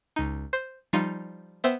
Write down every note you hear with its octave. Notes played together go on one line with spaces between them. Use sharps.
C#2 D#4
C5
F3 G3 D#4 F4
B3 C5 E5 G5